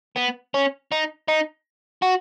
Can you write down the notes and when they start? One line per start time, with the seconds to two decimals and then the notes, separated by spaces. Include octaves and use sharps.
0.17 B3
0.54 C#4
0.92 D#4
1.28 D#4
2.03 F#4